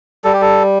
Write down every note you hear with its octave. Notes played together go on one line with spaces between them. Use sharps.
G3 A4
G4
A4